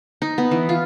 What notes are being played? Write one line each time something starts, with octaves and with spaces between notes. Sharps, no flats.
D#4
B3
E3
F4